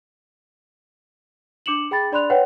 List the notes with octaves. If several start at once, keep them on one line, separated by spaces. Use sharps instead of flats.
D4 D6 C#7 E7 F#7
G#4 G5 B5 A6
D4 D5 B5 C6 F#6 F7
B4 C#5 D#5 F#5 G5